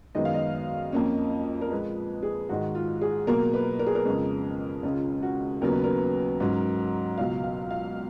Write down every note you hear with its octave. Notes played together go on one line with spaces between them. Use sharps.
F#2 D#3 G#3 B3 D#5
F5
D#5
F2 F3 A#3 C#4
A#4
A#2 F3 G#3 B4
G#4
G#2 D#3 G#3 F#4
F4
G#4
B2 F#3 A#3 A#4
B4
A#4
G#4
A#4
F2 C#3 G#3
C#2 C#3 G#3 C#4 F4
F#4
D#2 C#3 F#3 B3 A#4
B4
A#4
G#2 F#3 C#4
C#2 B2 F#3 F5
F5
F5